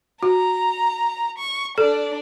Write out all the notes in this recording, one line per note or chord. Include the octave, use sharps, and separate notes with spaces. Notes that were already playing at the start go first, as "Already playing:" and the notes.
F#4 A#5
C#6
D4 A4 D5